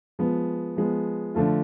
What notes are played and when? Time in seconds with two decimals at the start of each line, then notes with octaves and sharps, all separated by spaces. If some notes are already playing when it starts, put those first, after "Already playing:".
0.19 F3 G#3 B3
0.77 F3 G#3 B3
1.35 D3 F3 A3 F4